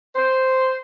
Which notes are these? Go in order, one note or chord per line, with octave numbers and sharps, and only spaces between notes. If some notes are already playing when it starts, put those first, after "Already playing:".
C5